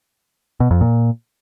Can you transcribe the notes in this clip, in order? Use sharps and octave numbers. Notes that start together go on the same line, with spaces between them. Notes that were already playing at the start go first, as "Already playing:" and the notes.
B2
F2
A#2